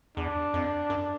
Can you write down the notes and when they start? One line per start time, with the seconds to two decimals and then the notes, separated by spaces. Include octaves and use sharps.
0.17 E2 D4
0.54 F2
0.90 F#2